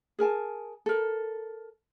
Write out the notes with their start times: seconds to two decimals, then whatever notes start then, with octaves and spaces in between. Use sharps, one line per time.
0.19 G#4 A#4 G#5 A5
0.86 A4 A#4